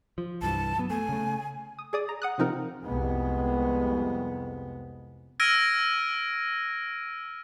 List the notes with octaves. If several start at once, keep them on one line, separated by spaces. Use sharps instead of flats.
F3
C2 G2 E3 A5
F#3 B3
A3 G#5
C#3 A3
D#6
G#4 D5 D#6
A#5
F#5 D#6 F#6
C3 F3 C4 D#4 F4 A#4
C2 F2 G#3 B3
E6 F6 G#6 A#6 D7 D#7